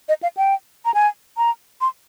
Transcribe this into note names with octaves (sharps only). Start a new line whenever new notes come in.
D#5
F5
G5
A#5
G#5
A#5
C6